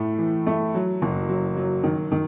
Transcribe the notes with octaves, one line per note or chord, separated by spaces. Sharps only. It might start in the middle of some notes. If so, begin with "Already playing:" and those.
Already playing: A2 A3
E3
A3
F#3
F#1
F#3
F#3
D#3
D#3